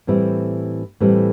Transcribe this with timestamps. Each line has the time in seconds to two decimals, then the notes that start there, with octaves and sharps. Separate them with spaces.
0.07 A2 E3 G3 C4 E4
1.00 A2 E3 G3 C4 E4